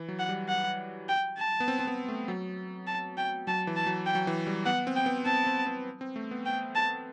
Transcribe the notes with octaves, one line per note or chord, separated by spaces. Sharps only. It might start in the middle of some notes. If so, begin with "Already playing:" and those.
Already playing: E3
F#3
F#5
G3
F#5
G5
A5
B3
C4
C4
B3
A3
F#3
A5
G5
F#3 A5
E3
A5
F#3
G5
F#3
E3
G3
B3 F#5
C4
G5
B3
C4 A5
C4
C4
C4
A3
B3
G5
A5